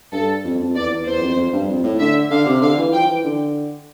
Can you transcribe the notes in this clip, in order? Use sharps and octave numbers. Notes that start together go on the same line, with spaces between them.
G2 A4
F2
F2
E2 D5
E2
E2 C5
F2
F2
G2
F2
A2
D3 E5
D3 F5
C3
D3 F5
E3
F3 G5
E3
D3